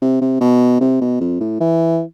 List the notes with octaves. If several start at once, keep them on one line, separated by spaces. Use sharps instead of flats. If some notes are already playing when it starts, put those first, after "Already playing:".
C3
C3
B2
C3
B2
F2
A2
E3